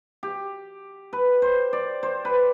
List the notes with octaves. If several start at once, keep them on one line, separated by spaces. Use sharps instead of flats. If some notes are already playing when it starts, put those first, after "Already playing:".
G4
B4
C5
D5
C5
B4